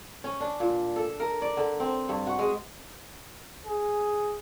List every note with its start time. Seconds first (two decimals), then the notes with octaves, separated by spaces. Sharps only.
0.24 C#4
0.40 D4
0.60 A#2
0.96 A4
1.20 A#4
1.42 D5
1.57 D3
1.80 C4
2.09 G2
2.27 F#4
2.39 G#3
3.65 G#4